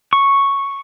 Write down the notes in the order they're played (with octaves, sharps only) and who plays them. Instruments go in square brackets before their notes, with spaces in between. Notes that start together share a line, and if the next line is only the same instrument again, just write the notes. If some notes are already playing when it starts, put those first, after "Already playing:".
[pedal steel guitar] C#6